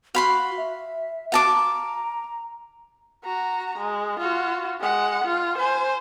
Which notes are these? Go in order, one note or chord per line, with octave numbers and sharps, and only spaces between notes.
F#4 F5 B5 C6
E5
F#4 F5 A5 D6
A#5
F#4 A#5
G#3
F4 F#4
G#3 F#5
F4
C5 G#5